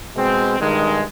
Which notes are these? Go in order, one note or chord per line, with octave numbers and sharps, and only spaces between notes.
B2 G#3 C4
G2 D#3 G#3